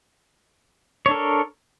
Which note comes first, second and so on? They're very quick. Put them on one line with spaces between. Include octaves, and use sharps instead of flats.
C#5 D4 A4 A#4